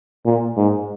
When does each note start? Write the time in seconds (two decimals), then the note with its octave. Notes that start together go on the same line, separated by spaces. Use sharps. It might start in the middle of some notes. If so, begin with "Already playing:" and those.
0.25 A#2
0.57 G#2